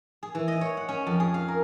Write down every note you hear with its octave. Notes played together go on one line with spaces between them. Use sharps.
G#4
E3
D#5
C#5
F#5
C#4
F2
G#4
F5
A#4